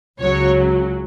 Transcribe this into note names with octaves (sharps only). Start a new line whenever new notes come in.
C#2 C#3 F#3 C#5